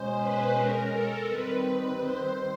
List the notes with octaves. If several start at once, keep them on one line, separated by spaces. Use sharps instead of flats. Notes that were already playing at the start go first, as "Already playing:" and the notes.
Already playing: B2 G#3 C#4 C5
B4
A#4
A4
D#3 G3 C4 B4
C5